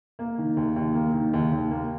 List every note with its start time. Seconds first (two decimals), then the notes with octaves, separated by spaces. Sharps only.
0.19 A#3
0.38 D#3
0.57 D#2
0.76 D#2
0.94 A#3
1.14 D#3
1.33 D#2
1.52 D#2
1.71 A#3